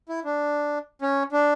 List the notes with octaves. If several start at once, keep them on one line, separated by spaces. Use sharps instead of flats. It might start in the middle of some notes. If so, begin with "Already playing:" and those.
E4
D4
C#4
D4